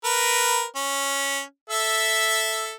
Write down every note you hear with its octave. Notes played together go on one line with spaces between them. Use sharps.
A#4 B4
C#4
A4 E5